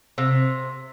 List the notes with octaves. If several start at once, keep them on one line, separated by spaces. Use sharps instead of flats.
C3